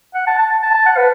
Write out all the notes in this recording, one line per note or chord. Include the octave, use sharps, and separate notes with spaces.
F#5
A5
A5
A5
A5
F#5
B4